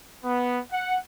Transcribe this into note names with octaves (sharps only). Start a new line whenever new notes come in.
B3
F#5